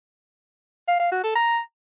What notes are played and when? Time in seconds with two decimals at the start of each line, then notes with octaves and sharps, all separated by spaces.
0.88 F5
1.00 F5
1.11 F#4
1.23 A4
1.35 A#5